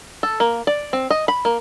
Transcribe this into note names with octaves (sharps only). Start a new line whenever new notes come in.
A4
A#3
D5
C4
D#5
B5
A#3